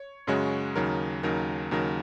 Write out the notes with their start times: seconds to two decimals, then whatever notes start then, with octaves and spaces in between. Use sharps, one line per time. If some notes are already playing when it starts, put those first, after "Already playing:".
Already playing: C#5
0.27 F#2 C#3 G#3 F#4 C#5
0.75 D#2 C#3 F#3 D#4 A#4
1.23 D#2 C#3 F#3 D#4 A#4
1.71 D#2 C#3 F#3 D#4 A#4